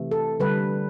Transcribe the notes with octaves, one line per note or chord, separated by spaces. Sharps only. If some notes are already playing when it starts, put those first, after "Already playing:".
Already playing: C3 E3 A3
A4
D3 G3 B4